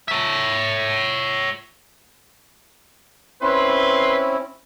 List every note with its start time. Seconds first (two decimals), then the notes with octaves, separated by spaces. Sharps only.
0.08 C#5 E5
3.42 C4 C#4 E4 B4 C6